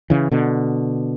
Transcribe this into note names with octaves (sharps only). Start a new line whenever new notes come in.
C#3 E3
B2 D3